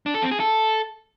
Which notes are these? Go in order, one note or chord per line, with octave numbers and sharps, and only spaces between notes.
D4
A4
C4
G#4
A4